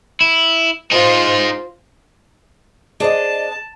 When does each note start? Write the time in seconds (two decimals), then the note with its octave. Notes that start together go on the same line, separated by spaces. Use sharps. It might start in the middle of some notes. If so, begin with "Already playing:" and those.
0.21 E4
0.91 D#4 F4 G#4 C5
3.00 D4 G#4 C5 D#5 A5